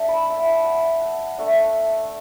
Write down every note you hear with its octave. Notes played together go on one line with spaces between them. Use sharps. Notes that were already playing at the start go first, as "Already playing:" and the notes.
Already playing: A3 D4 A5
B5
E5
F#5
A5
F#5
F#5
A3 D4